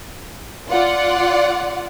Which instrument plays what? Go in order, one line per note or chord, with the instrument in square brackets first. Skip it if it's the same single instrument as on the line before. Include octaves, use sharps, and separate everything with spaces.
[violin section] F4 D5 F#5